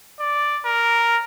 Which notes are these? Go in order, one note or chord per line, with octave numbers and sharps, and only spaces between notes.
D5
A#4